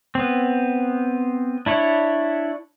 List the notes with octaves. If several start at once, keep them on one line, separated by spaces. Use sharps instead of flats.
B3 C4
D4 E4 C#5